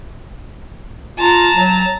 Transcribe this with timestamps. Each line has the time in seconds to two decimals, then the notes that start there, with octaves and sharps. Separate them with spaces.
1.18 F4 A5 A#5
1.54 F#3